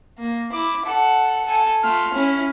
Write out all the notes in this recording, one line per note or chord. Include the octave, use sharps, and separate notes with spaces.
A#3
E4 D6
A4 F#5
A4 G#5
A3 F4 F6
C#4 E4